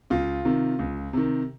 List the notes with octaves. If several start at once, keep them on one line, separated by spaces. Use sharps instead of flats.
C#2 F4
C3 D#3
C#2
C3 D#3